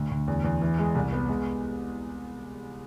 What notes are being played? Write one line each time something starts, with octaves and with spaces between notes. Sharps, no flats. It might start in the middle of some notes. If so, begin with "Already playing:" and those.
Already playing: D2
D2
E2
E2
E3
G#3
C2
B3
G#3